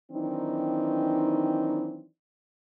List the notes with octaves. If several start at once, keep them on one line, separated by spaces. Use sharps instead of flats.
D#3 E3 F#3 C4 D4 D#4